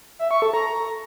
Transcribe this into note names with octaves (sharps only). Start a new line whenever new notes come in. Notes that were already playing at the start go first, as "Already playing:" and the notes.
E5
C#6
A4
A#5